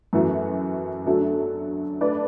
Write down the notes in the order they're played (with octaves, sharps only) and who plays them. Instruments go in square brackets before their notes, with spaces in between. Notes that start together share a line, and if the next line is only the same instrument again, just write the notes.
[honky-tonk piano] F#2 E3 A3 F#4
D3 F#3 A3 F#4 A4
A3 D4 B4 D5